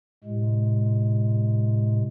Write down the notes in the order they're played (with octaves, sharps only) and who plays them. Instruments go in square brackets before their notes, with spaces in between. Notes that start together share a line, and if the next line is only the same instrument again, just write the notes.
[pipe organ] A2 C3 G#3